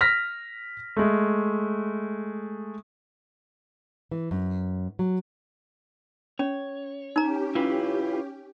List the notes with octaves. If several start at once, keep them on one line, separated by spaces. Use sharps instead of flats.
F6 A#6 B6
G#3 A3
E3
F#2
F#3
C#4 C#5
C#4 D#4 G4 A#5
E4 F4 B4